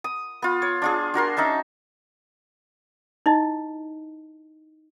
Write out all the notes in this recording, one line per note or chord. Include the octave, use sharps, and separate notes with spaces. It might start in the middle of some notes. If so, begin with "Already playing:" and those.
D#6
B3 F4
C#5
D4 F4 G#4
D4 F#4 A#4 C6
C#4 D#4 E5 A5
D#4 E4 D#5